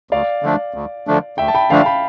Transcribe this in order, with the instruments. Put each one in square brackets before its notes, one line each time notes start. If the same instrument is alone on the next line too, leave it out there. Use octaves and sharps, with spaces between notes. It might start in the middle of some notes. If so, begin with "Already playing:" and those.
[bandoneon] D2 [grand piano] D5 F5
[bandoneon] D3 F3 A3 D4
D2
D3 F3 A3 D4
[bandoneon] D2 [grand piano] E5 G5
[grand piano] A5
G5 B5
[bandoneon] D3 F3 A3 D4 [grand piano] F5 A5
[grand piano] G5 B5